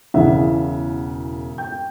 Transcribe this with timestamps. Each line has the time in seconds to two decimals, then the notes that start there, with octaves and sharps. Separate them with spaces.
0.14 E1 C#3 E3 E5 F#5
1.58 G5 G6